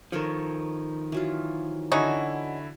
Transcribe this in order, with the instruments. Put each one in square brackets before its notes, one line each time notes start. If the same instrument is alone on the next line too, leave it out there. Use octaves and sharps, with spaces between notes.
[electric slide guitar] D#3 F3 [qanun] A4 A#4 C#5
[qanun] E3 F#3 F4
[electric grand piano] D3 E4 [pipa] C#4 D#4 F#4